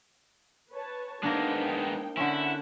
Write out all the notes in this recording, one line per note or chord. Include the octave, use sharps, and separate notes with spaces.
B4 C#5 A5
G#3 A#3 B3 D4 D#4 C5 G5
D3 C#4 E4 F#5